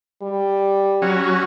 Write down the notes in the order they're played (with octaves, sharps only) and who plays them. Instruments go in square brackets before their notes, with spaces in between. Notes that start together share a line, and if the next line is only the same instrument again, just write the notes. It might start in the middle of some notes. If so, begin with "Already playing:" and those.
[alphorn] G3
[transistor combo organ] F#3 C#4